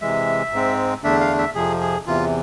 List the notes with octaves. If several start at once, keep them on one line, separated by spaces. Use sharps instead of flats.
C3 E3 G#3 E5
G#2 G#3 C4
E2 D3 A3 D4 E5
F5
E5
F2 C3 F3 G#4
G#4
E2 C3 E3 F4